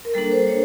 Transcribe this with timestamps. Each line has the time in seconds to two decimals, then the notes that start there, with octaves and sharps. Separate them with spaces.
0.05 A#4
0.14 G3 A#3 D4 A4
0.32 C5
0.48 C#5